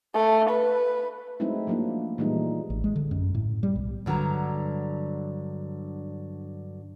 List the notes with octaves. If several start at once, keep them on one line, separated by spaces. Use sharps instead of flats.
A3
B4
F#3 G#3 A3 C4 D#4 E4
F3 F#3 A#3 D4 E4
A#2 E3 G3 G#3 D#4
A1
G#3
D3
F#2
A2
G3
B1
G2 D3 F#3 A#5